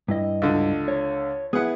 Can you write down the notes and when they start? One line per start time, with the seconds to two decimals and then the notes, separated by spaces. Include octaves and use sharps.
0.08 G2 E4 D#5
0.42 C#2 D3
0.88 C#5
1.53 B3 E4 G#4 F#5